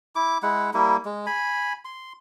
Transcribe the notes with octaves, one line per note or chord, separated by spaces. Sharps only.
E4 D6
G#3 E4 F#5
G3 A#3 E4
G#3
G#5 B5
C6